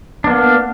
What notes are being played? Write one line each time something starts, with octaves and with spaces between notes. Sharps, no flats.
A#3 B3 D4